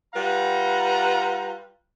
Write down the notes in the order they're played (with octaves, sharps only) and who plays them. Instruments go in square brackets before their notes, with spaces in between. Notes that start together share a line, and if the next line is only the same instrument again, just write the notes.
[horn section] G3 F4 B4 F#5 A#5